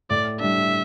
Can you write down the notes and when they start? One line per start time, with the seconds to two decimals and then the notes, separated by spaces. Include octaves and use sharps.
0.10 A2 D5
0.40 G3 D4 E5